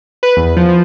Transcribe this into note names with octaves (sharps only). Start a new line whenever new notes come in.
B4
E2
F3
F3